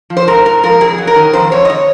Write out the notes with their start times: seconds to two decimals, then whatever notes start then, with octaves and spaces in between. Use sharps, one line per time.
0.10 F3
0.17 C5
0.28 G#2 A#4
0.45 G#2 A#4
0.63 F3 A#4
0.81 F2 G#4
0.98 F#3
1.07 A#4
1.16 D#3
1.33 F2 C5
1.51 F2 C#5
1.65 D#5
1.70 C#5